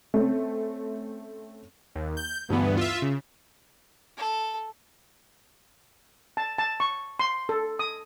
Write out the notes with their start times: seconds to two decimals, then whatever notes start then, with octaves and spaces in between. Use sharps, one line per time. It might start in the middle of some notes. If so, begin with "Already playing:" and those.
0.14 A3 C4 C#4
1.95 D#2
2.17 G6
2.49 D2 G2 E3 B3
2.77 F4 E5
3.02 C#3
4.17 A4
6.37 A5
6.58 A5
6.80 C#6
7.19 C6
7.49 A4
7.79 D#6